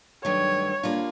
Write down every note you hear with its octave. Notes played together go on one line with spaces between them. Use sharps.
G2 D#3 F#3 A3 C#5
G3 A#3 D4 F4